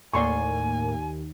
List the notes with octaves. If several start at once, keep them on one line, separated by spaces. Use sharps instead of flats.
D#2 A2 A#3 D5 G#5 C6 C#6